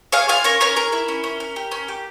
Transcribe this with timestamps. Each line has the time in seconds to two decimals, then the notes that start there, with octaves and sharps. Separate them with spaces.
0.12 G#4 C#5 F5
0.28 F4 F5 G#5
0.44 C#4 A#4 C#5
0.60 C#4 A#4 C#5
0.76 G#4 A#4
0.92 E4
1.08 C#4
1.24 C#4
1.40 C#4
1.56 G4
1.72 C#4
1.88 G4